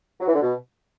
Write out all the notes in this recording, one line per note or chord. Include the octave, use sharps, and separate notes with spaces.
F#3
E3
D3
B2